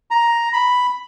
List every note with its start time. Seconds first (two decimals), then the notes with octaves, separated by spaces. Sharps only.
0.11 A#5
0.53 B5